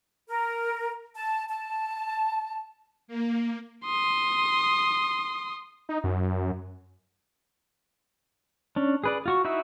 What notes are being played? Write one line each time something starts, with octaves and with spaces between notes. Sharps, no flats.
A#4
A5
A5
A#3
C6 D#6
D#4
F#2
C#4 D4
G#4 B4 D5
F4 F#4 C#6
D#4 E4 F#4 E5